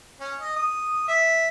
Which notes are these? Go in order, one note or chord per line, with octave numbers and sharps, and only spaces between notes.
C#4
D#5
D#6
E5